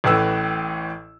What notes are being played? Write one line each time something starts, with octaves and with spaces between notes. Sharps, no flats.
A1 A2 E3 E6